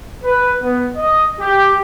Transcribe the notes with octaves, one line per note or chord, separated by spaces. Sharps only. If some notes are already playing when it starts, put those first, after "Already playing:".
B4
B3
D#5
G4